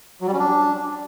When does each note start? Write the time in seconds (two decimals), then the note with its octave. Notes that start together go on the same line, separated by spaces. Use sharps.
0.21 F#3
0.27 G3
0.33 C#4
0.39 D4